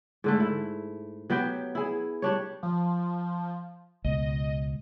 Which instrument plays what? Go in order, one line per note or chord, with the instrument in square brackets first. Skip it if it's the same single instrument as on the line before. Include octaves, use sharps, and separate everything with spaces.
[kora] G#2 D3 A3
E4
F#3 B3 G4 G5
E4 G#4
G3 D4 C#5
[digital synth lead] F3
[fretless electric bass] C#2 B2 [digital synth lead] D#5